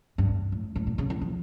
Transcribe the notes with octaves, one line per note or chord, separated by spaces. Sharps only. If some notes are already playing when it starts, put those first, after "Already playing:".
G2
A2
A2
A#2
C#3
E3
F3